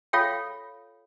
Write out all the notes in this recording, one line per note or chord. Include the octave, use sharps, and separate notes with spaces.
F4 A4 C#5 F5 G5